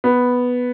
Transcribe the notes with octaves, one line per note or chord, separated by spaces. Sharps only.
B3